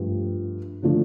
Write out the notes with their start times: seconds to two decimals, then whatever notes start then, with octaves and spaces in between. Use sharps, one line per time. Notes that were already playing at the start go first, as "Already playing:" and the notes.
Already playing: G2 F3 A3 D4
0.82 D3 F3 A3 D4